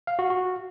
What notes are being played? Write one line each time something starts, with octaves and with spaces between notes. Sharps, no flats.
F5
F#4
F#4